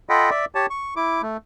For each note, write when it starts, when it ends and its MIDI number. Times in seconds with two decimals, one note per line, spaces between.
0.09 0.30 65
0.09 0.30 69
0.09 0.30 75
0.09 0.30 78
0.09 0.30 79
0.09 0.30 83
0.30 0.45 74
0.30 0.45 76
0.55 0.66 67
0.55 0.66 73
0.55 0.66 81
0.70 0.94 85
0.96 1.22 64
0.96 1.22 86
1.22 1.37 57